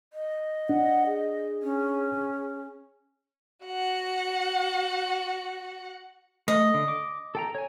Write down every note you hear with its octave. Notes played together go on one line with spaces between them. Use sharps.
D#5
D4 F#5
G#4
C#4
F#4 F#5
A3 D#5
D3
D6
A4 G5 A#5
C#5 G#5